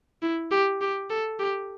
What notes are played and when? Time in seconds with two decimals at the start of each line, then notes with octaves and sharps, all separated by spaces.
0.23 E4
0.51 G4
0.81 G4
1.10 A4
1.39 G4